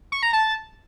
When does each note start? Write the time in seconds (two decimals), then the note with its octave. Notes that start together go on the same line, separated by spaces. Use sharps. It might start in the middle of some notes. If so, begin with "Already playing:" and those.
0.12 C#6
0.23 A#5
0.33 A5